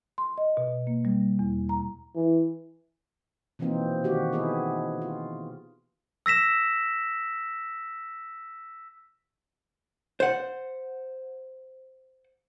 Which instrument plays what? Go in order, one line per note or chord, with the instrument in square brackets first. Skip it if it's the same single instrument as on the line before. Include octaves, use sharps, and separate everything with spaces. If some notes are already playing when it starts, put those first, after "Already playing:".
[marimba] C6
D#5
B2
A#3
G3
E2
A#5
[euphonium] E3
[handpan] B2 E3 F3 A#3 C4 D#4
D#3 F#4 G4
B3 D#4 E4 G#4
F4
[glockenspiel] E6 A#6 B6 E7
[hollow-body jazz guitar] C5 F#5